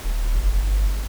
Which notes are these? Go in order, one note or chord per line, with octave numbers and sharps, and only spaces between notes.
D#1
G1